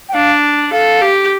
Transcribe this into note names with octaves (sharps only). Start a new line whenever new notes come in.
G5
D4 F5
A4 F5
G4